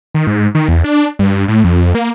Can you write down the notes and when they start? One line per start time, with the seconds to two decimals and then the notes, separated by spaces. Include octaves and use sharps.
0.14 D#3
0.27 G#2
0.55 D#3
0.68 E2
0.84 D4
1.19 G2
1.48 A2
1.64 F2
1.95 A#3